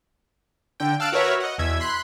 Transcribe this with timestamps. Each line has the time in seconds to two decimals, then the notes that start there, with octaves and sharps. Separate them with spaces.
0.80 D3 G5
1.00 F5 A5 E6 F#6 D7
1.12 F#4 A#4 B4 C#5 E5 F#5
1.40 D#5 F#5
1.58 E2 B2 E5 G#6
1.80 B5 C6 F#6